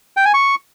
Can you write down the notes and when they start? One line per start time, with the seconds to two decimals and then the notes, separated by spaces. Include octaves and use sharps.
0.17 G5
0.25 G#5
0.34 C#6